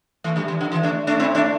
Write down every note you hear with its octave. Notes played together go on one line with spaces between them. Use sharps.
E3 A3
D3 G3
E3
D3
E3
A3 D4
A3 D4
C4 E4
A3 D4